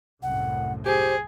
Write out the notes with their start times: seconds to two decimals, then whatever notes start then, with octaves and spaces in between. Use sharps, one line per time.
0.23 C2 F#2 A2 F#5
0.86 G4 G#4 C5